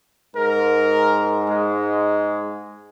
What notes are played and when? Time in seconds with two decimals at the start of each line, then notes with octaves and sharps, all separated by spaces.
0.36 G#2 A#4
1.49 G#3